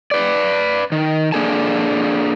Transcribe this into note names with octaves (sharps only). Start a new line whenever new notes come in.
B4 D5
D#3
A#3 D4 G#4 A4 G#5 A5